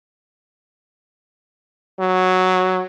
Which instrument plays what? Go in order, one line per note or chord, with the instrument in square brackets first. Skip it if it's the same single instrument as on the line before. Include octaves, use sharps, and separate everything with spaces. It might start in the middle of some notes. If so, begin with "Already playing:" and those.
[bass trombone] F#3